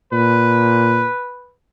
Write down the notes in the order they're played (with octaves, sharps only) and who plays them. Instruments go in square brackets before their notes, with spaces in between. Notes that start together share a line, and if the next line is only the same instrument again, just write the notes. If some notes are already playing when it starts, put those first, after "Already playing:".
[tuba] A#2 [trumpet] B4